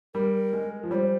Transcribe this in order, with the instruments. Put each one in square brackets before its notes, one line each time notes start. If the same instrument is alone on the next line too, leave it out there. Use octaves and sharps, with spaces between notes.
[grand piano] G3 [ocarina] A#4
[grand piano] G#3
F3
[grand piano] G3 [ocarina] C5 C#5